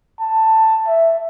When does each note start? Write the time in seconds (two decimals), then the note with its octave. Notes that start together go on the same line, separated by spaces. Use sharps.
0.20 A5
0.87 E5